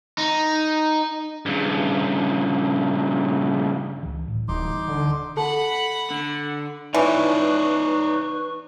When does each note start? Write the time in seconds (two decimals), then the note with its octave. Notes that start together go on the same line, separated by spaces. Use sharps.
0.18 D#4
1.46 G2 C#3
4.03 C#2 E3
4.28 D1 A2
4.48 D1 D2 E3 G3 D#4 C6 D6
4.88 D3
5.37 A4 F#5 A5 B5 C#6
6.10 D3
6.94 E3 D#4 B4 C#5 D5 C#6